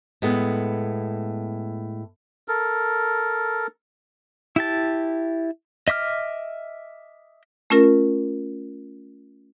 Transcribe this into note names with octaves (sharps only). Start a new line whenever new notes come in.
A2 G#3 B3
A4 A#4
E4 G4 A5
D#5 E5 D6 F6
A3 C#4 F4 A#4